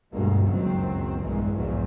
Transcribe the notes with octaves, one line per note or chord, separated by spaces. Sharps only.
G1 D2 G2 B2 G#3 A#3
F#1 C#2 F#2 D#3 F#3 C4
A#1 E2 G2 E3 G#3 A#3
B1 E2 G#2 D#3 F3 F#3